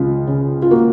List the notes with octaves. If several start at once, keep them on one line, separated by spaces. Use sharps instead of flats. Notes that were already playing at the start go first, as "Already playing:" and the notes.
Already playing: C#2 F4
C#3
F4
A#3 F#4